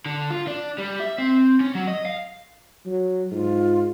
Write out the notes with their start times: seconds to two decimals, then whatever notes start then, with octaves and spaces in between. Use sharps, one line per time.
0.06 D3
0.30 F4
0.48 D4
0.78 G3
1.00 E5
1.18 C4
1.60 C#4
1.75 F#3
1.87 D#5
2.05 F5
2.86 F#3
3.32 G#2 F4